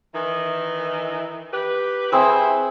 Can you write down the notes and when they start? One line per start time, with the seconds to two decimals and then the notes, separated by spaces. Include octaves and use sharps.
0.15 D#3 E3
1.52 G4 B4
2.12 C4 E4 G#4 B4 C5 E5